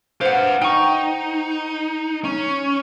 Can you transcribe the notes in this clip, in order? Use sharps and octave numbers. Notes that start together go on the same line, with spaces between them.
B4 C5 F5 F#5
D#4 G5 C#6
C#4